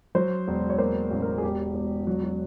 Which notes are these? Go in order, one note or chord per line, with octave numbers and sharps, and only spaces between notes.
F#3 C5
E1
C#5
A#3 C5
A1
A#4
G#4
E1 G4
E1
F#3 F#4
F#4